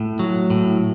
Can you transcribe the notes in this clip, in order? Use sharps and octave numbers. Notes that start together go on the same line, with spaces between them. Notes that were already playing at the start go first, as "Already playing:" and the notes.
Already playing: A2
F#3
A2